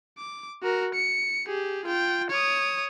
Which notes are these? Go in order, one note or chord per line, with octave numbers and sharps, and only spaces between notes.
D6
F#4 A#4
C#7
G4 G#4
F4 G5
C#5 D#6